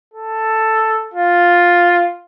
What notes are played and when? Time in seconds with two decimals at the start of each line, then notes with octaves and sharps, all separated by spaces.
0.14 A4
1.14 F4